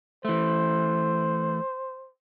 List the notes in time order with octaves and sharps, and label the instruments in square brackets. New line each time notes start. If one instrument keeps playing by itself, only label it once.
[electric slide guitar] E3 A3 [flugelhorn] C5